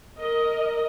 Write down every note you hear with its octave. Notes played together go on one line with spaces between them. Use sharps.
A#4 D#5